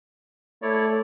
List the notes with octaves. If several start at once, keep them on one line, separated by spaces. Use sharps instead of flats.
A3 E4 C#5 D5